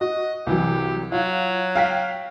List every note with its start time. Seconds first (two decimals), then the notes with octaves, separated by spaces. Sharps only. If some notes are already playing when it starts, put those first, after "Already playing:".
0.01 F#4 D#5
0.47 C2 E3 F#3 G4
1.12 F#3 F4
1.75 F5 G5 B6